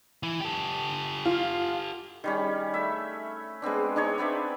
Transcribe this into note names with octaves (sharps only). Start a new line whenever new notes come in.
E3
G4 A4
F4
D#3 G3 C#4
A3 E5
G#3 B3 C4 D4
D4 D#4 G#4 C#5
B3 C4 D5 E5